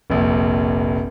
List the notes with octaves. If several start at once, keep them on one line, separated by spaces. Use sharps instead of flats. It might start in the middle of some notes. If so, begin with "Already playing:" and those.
F1 A#1